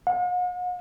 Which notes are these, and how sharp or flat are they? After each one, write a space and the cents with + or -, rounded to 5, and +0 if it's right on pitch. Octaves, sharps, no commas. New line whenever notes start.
F#5 -45